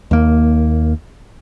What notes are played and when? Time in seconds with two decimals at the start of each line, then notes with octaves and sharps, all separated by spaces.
0.11 D#2 A#3